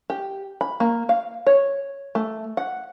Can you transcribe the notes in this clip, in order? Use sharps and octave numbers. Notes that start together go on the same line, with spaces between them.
G4
B5
A#3
F5
C#5
A3
F#5